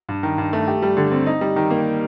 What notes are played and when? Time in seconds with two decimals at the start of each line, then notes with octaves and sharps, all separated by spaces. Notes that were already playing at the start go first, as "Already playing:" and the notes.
0.09 G2
0.23 D#3
0.38 G2
0.53 A3
0.68 G4
0.82 G3
0.97 D3
1.12 C4
1.26 D#4
1.41 G3
1.56 D#3
1.70 A#3